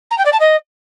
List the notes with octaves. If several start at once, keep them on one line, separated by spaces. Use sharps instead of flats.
A#5
G5
D5
A5
D#5